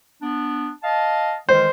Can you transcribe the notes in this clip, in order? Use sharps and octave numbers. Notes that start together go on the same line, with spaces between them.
B3 D4
D#5 F5 A5
D#3 E3 G#3 C5